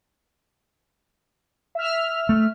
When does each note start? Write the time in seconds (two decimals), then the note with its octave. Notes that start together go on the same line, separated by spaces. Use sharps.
1.75 E5 F6
2.29 A3